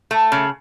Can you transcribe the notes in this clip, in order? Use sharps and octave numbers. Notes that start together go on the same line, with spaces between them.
A3
C#3